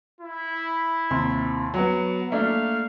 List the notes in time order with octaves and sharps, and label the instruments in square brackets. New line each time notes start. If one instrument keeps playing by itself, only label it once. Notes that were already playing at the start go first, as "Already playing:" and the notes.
[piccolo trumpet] E4
[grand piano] D#2 C3 C6
F#3 B3
[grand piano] A3 A#3 D4 [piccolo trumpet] F5